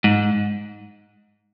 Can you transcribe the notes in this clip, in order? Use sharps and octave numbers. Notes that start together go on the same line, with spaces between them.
G#2